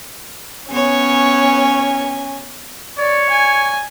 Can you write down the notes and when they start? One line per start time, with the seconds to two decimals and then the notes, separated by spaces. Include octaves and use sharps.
0.71 B3 C#4 C#5 G#5
2.98 C#5 D5
3.30 G#5